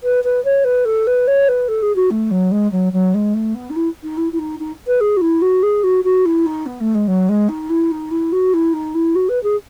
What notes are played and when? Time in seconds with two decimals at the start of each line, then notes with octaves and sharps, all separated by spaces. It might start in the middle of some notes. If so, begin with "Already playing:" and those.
0.03 B4
0.24 B4
0.45 C#5
0.64 B4
0.85 A4
1.07 B4
1.27 C#5
1.48 B4
1.68 A4
1.82 G#4
1.96 F#4
2.10 A3
2.31 F#3
2.51 G#3
2.72 F#3
2.93 F#3
3.14 G#3
3.34 A3
3.55 B3
3.70 D#4
3.76 E4
4.03 D#4
4.17 E4
4.32 E4
4.39 D#4
4.60 D#4
4.87 B4
5.01 G#4
5.17 F#4
5.21 E4
5.41 F#4
5.63 G#4
5.83 F#4
6.04 F#4
6.25 E4
6.46 D#4
6.66 B3
6.80 A3
6.95 G#3
7.07 F#3
7.29 G#3
7.49 D#4
7.70 E4
7.91 D#4
8.11 E4
8.32 F#4
8.54 E4
8.73 D#4
8.95 E4
9.15 F#4
9.29 B4
9.43 G#4